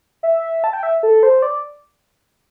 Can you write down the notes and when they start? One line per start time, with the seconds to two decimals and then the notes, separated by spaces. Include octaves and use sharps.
0.23 E5
0.64 A5
0.73 G5
0.83 E5
1.03 A4
1.23 C5
1.42 D5